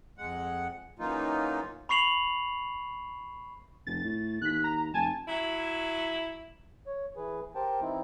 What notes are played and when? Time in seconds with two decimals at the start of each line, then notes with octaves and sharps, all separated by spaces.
0.18 F2 G#3 F#5
0.99 C#3 E3 F#3 A#3 D#4 F4
1.89 B5 C#6 C7 F7 F#7
3.87 F1 A6
4.04 A2
4.42 D#2 F#6 B6
4.64 A#5
4.94 F1 G#5 A5
5.28 F#3 E4
6.87 C#5
7.16 E3 G#4 B4
7.55 G4 A#4 C5 G5 A5
7.81 E3 C4 D#4 E4